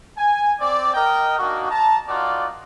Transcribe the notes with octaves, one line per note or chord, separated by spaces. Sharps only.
G#5
C4 D5
A#4 D#5 G5
A#3 D4 D#4 F#4
A5 A#5
A#3 D#4 F4 F#4 D5 F#5